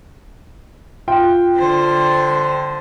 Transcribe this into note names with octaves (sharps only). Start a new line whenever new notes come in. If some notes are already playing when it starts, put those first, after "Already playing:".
F4 G5
D3 C5